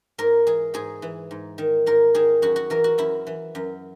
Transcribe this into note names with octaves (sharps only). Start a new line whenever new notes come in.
G#2 A#4
E3 G#4
G#2 G#4
E3
G#2
D#3
G#2 A#4
D#3 G#4
F#2 F#4
F#4
E3 A#4
F#4
F#2 E4
E3
F#2